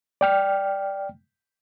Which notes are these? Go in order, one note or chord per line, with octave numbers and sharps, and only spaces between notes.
D5 G5 F6